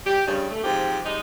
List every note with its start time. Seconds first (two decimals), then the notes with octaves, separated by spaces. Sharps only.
0.06 G4
0.27 G2 C#3 G3
0.50 A3
0.64 G#2 F3 C4 G4
1.05 G3 G#3 D#4